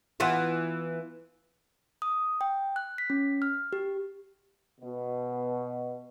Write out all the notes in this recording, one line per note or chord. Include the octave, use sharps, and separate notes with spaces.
E3 B3 F4
D#6
G5
F#6
B6
C#4
F6
G4
B2